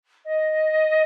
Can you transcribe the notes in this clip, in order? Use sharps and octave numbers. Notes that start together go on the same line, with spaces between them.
D#5